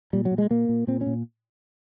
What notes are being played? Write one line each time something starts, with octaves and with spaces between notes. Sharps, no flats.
A#2 G3
F#3
A#2
G#3
A#2 A#3
A#2
A#2 C4
C#4
A#2